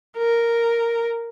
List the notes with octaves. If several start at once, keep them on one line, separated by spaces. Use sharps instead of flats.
A#4